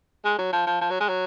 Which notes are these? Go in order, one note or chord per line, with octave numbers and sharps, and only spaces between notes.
G#3
F#3
F3
F3
F3
F#3
G#3
F#3